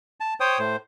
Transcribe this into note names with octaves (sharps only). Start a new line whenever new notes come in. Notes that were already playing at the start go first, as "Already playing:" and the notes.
A5
C5 C#5 G5 D#6
A2 C5